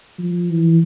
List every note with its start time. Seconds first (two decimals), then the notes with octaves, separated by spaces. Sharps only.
0.19 F3
0.50 E3